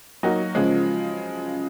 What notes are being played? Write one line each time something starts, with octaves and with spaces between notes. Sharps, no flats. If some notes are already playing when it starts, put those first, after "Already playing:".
F#3 A#3 D#4 F#4
C#3 F3 G#3